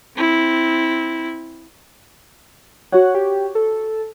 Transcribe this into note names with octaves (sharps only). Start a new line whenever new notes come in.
C4 E4
F#4 C#5 F#5
G4
A4